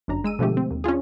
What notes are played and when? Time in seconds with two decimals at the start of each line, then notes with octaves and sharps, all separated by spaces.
0.08 G1 F#2 D4 A#5
0.24 G#3 E6 D#7
0.39 B2 D3 F3 G#3 A3 G4
0.57 C4
0.71 D#2
0.84 C#4 D4 F4 G#4